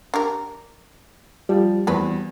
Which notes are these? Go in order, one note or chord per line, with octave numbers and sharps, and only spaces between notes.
D4 G4 A#4
F3 G3
E2 F#3 C4 B4